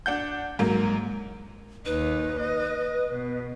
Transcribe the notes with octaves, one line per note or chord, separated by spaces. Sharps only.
D4 F#5 G6
G#2 F#3 A#3
D#2 D#4 B4
D#5
B2